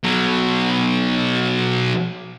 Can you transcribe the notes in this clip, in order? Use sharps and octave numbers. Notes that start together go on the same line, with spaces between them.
B2 F#3